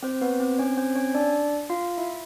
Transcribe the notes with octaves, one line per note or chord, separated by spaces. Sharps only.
C4 C5
B3 B4
C4 C5
C#4 C#5
C4 C5
C#4 C#5
D4 D5
F4 F5
E4 E5